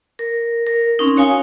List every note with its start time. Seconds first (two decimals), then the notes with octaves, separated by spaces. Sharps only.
0.19 A#4
0.67 A#4
0.99 C4 C#4 D#4
1.17 F#4 C#5 F5 G#5 D#6